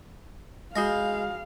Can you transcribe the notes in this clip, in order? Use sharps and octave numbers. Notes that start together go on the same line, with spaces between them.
G#3 F#4 F5 D#6 A#6